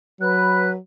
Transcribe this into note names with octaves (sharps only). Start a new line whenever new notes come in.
F#3 B4 F#6